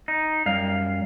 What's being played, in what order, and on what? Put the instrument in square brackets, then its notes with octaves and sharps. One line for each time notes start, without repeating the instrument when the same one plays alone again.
[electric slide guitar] D#4
F#2 G3 F5